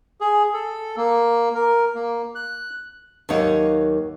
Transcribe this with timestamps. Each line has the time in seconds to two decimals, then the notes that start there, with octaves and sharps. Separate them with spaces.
0.21 G#4
0.54 A4
0.97 A#3
1.55 A#4
1.95 A#3
2.35 F#6
3.29 D#2 F#3 A#3 D#4 C#5 F#5